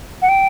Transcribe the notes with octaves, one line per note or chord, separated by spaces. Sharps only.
F#5
G5